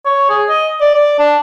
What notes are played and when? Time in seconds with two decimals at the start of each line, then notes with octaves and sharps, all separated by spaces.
0.05 C#5
0.29 G#4
0.49 D#5
0.81 D5
0.94 D5
1.18 D4